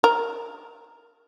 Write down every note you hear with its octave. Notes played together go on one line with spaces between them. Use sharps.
A#4